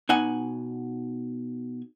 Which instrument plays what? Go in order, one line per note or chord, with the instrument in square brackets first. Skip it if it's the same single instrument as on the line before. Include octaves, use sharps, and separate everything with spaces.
[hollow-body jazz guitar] B2 D#4 F#5 G#5